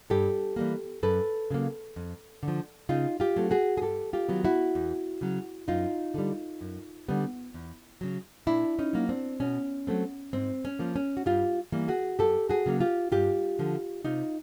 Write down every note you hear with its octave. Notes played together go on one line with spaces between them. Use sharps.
G2 G4 A4
E3 G3 A#3
F#2 A4 B4
C#3 F#3 A#3
F2
D3
F3
C#3 D#4 F4
F4 G4
F#3 A3 C4
F#4 G#4
G#4
G2 G4 A4
F4 G4
D#3 F#3 B3
E4 F#4
E2
C#3 F#3
F#2 D#4 F4
D3 G3
F#2
D3 G3 B3
E2
C#3 F#3
A#2 D4 E4
C#4 D#4
F#3 A#3
C4 D4
B2 C#4
F#3 A3 C4
G#2 C4
C#4
F3 A#3
C#4
F#4
G2 F4 G4
E3 G3 A#3
F#4 G#4
F#2 G4 A4
F#4 G#4
C#3 F#3 A#3
F4 G4
G2 F4 G4
D3 F3
C3 D#4 F4